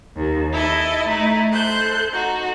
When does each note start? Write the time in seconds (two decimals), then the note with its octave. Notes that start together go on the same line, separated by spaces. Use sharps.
0.16 D#2
0.52 E4 A4 D#5
1.08 A3 D#4 E4
1.52 A4 C5 F#6 G6
2.13 D#4 F#4